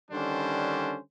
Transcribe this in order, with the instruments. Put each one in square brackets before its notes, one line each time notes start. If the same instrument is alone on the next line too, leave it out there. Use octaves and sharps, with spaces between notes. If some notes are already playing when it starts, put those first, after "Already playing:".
[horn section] D3 D#3 G3 C#4 D4 C5